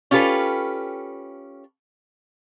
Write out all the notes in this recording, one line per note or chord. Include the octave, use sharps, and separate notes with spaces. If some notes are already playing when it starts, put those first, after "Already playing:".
C#4 F4 G4 A4 B4